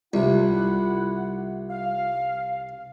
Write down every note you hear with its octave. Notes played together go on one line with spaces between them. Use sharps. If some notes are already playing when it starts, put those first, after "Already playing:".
C2 G3 E4 F4 E5 F#5
F5